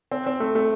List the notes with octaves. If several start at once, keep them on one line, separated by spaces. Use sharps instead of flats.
C4
C4
A3
A3